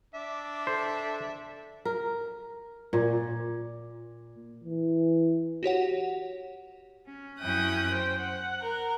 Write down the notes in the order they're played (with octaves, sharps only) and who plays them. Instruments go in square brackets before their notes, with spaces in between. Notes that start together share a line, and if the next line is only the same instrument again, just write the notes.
[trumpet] D4 [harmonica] E5 [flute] D6
[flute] A4 [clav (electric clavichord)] C5
[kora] A#4
A#2
[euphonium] E3
[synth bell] F#4 G4 C#5 F#5
[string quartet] C#4
F#2 C#4 E4 G5 D#6 F#6
C5 G5
F#5
A#4